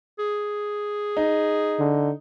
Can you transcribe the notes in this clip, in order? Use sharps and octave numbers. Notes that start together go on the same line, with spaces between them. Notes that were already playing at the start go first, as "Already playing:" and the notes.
G#4
D#4
D3